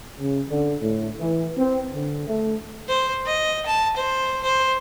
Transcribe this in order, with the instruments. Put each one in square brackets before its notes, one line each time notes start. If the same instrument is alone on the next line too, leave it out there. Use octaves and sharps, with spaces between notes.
[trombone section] C#3
D3
A2
E3
C4
D3
A3
[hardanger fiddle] C5
D#5
A5
C5
C5